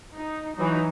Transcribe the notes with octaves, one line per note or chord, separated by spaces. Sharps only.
D#4
E3 F#3 D#4